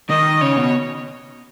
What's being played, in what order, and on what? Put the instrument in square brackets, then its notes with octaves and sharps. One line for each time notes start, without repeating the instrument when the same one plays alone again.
[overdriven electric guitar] D#3 [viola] D#5
[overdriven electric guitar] C#3 [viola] C#5
[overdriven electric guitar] B2